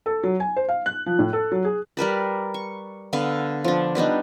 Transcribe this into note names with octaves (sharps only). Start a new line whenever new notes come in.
A4
F#3
G#5
C5
F5
F#6
F3
A2
A4
F#3
G#4
G3 A#4 B4 D5
C#6
D3 B3 F5
F3 D4
G3 B3 D4 D#4